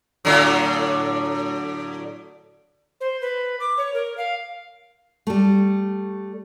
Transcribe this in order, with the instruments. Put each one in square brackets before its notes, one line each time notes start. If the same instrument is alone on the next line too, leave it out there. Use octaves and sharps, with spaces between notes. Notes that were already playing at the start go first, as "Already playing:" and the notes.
[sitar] A2 D3 F#3
[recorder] C5
B4
D6
C#5
A#4
F5
[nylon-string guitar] G3 A3